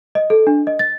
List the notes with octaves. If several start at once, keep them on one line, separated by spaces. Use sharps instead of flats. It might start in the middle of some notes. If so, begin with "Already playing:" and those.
D#5
A4
D4
D#5
A6